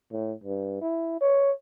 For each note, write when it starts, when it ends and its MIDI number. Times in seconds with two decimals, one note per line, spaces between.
0.12 0.33 45
0.44 0.80 43
0.81 1.20 64
1.21 1.51 73